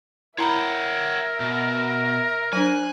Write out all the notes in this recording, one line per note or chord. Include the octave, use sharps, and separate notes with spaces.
E4 A#4 C#5 E5 F#5 G5 A#5 B5
B2
F#3 D4 C5 G#5 F#6